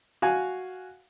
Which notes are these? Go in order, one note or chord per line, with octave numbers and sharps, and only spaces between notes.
F#4 F5 G#5